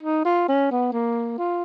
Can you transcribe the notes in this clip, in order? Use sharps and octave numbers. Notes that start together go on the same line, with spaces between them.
D#4
F4
C#4
B3
A#3
F4